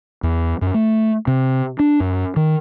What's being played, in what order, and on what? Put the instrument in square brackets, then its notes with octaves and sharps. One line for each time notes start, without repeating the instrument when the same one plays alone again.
[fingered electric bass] E2
F#2
A3
C3
D4
F#2
D#3